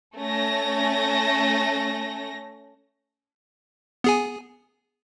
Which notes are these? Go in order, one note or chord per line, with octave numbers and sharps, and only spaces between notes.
A3 C#4 A#6
B3 G#4 G#5